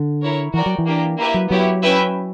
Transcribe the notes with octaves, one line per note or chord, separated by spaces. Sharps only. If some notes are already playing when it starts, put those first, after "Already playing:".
Already playing: D3
E4 A#4 C#5
E3 F#4 A#4 D5 G5
F#3
E3
A#3 D4 G4
A#3 E4 G4 B4 E5
F#3
F#3 B3 E4 G4 C#5
C#4 E4 B4 E5 G5